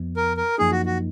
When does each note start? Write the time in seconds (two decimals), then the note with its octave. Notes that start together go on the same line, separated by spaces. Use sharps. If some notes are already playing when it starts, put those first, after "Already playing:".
Already playing: F2 F3 B3
0.17 A#4
0.37 A#4
0.58 F#2 F3 A#3 D#4 G#4
0.72 F#4
0.86 F#4